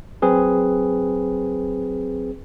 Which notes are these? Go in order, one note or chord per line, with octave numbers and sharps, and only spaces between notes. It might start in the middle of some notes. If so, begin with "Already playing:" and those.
F#3 C4 G#4 B4